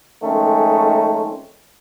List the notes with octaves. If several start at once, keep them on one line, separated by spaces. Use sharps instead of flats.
F2 D#3 G#3 A3 C#4